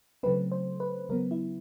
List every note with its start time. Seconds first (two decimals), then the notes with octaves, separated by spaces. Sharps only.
0.23 C#3 F#3 A3 C4 B4
0.52 C5
0.80 B4
1.09 C#3 F#3 B3 A#4
1.31 E4